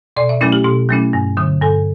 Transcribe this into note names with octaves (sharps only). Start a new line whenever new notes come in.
B2 D5
E5
F#3 A3 C#4 E4
G4
B2 G4
F#3 A3 C#4 E4
G2
D3 F#3
G2 A4